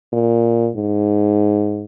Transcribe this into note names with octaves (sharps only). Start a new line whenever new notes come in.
A#2
G#2